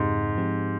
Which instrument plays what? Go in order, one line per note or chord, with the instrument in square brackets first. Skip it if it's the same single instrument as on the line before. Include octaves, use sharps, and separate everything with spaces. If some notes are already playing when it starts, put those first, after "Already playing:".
Already playing: [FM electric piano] F2 C#3 G#3 C4 G4 [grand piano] G#2
[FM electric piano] F3 C4 G4